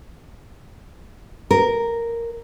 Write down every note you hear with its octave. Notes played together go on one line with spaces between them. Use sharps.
A#4